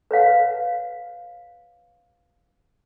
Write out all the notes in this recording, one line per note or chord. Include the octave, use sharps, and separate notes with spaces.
B4 C#5 F5 F#5